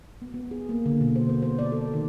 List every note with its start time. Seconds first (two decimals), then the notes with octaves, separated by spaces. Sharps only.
0.22 B3
0.34 B3
0.51 G#4
0.69 A#3
0.86 D3
1.01 B2
1.16 C5
1.29 B3
1.42 C5
1.59 D5
1.72 A4
1.94 D#3